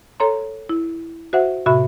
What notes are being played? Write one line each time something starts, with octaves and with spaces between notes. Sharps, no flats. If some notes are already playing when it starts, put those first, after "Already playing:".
A4 C#5 A#5 C6
E4
F#4 C5 E5 F#5
A2 C3 F#4 E5 B5